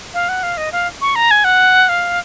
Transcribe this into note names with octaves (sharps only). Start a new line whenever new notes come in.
F5
F#5
F5
D#5
F5
C#6
A#5
G#5
F#5
F5